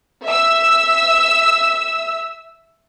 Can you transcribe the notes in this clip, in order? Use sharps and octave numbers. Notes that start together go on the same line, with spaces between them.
E5 E6